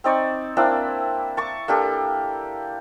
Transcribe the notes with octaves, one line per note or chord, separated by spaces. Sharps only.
C4 D#4 D5 C#6
A#3 C4 D4 E4
A5 C#6 D6
A#3 D4 G4 A4